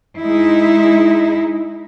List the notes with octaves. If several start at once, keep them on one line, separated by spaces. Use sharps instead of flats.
G#3 D#4 E4